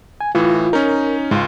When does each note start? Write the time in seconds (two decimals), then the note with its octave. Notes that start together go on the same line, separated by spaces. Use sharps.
0.21 G#5
0.35 A2 E3 F4
0.73 C#4 D#4 A#4
1.31 C#2 G#2 F4